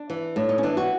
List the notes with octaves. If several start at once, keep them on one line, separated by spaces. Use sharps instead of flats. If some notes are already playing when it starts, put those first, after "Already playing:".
Already playing: D4
E3
A2 D4
D#4
C#4
E3 D4
F#4